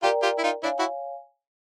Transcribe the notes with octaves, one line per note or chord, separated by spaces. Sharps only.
F4 G4 A#4 D5 G5 A#5
F4 G4
E4
D#4 F4
D4 E4 C#5 F5 G#5
E4 F#4